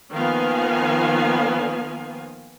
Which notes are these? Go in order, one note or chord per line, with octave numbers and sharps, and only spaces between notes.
D#3 F3 A#3 B3 F5 G#5